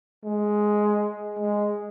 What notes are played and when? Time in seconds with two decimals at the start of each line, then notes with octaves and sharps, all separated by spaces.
0.25 G#3
1.39 G#3